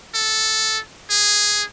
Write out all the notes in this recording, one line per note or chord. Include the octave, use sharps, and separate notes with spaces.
A4
G#4